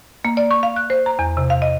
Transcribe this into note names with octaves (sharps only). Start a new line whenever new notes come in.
A#3
D5
C#6
F5
F#6
C5
A#5
E2
C3
F5
D#5